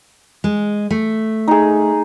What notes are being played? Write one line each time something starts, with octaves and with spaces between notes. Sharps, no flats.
G#3
A3
D#4 G#4